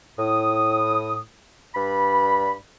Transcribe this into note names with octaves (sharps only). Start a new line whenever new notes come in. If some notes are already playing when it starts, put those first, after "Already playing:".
A2 D#6
G2 D5 B5